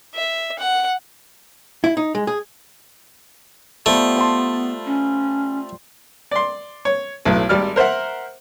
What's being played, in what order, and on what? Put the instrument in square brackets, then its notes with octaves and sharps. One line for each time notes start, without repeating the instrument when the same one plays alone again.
[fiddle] E5
F#5
[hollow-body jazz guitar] E4
D#4
G#3
G#4
[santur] G3 F4 C5 [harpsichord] A3 [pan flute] B3
[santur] C5 A5 C6
[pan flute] C#4
[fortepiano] D5 C6
C#5
B1 A2
G#1 G3 D5 F6
A#4 C5 E5 F#5